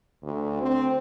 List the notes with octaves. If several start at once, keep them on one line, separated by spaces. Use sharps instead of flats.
D2
C4